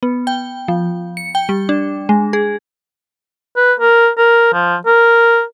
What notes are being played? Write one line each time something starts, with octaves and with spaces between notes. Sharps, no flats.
B3
G5
F3
C#7
G5
G3
D4
G#3
G#4
B4
A#4
A#4
F3
A#4